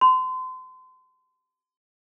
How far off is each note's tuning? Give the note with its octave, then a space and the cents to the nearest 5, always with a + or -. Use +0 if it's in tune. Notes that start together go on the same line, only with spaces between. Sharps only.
C6 -35